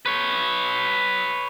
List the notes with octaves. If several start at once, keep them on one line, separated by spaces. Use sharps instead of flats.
B4 C#5